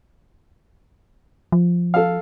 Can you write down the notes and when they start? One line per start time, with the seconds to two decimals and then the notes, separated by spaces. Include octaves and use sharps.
1.52 F3
1.94 A4 F5